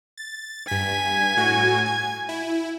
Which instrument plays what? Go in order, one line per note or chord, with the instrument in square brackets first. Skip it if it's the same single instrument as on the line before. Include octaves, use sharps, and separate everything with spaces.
[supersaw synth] A6
[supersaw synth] G2 B6 [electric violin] G#5
[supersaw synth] A2 F#4
G#6
E4